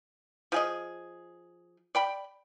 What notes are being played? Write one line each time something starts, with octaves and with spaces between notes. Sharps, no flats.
F3 G#4 D#5
D5 G5 B5